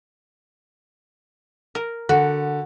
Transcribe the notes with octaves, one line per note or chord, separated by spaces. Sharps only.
A#4
D3 F#4